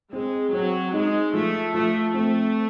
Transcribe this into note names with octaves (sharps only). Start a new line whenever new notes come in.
G#3 C4
F#3 C4
G#3 D#4
F3 A3
F3 A3
A3 C4